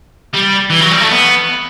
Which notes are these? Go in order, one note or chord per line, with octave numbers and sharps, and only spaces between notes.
G3
E3
F#3
G3
A3
B3